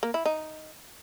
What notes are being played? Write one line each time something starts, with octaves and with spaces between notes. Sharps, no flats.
A#3
E4
D#4